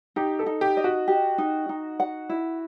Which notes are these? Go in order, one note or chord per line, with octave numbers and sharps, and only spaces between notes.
D#4 G4
A4
D#4
G4
D#5
F#4
G4
D#4
D#4
F#5
E4